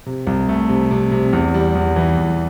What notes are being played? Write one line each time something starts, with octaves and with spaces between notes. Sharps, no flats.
C3
C2
A3
C3
C3
C3
E2
G3
E2
E3
E2